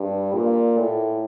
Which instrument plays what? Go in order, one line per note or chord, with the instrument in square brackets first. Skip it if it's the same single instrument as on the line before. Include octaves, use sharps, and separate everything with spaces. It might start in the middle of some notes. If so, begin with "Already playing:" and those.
Already playing: [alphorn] G2
A#2
A2